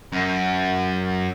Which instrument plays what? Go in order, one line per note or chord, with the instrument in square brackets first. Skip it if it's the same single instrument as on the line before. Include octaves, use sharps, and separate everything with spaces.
[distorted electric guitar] F#2